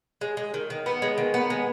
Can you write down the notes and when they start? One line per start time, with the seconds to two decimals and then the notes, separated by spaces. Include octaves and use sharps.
0.21 G#3
0.37 G#3
0.54 D#3
0.70 D#3
0.86 B3
1.02 G#3
1.18 D#3
1.34 B3
1.50 G#3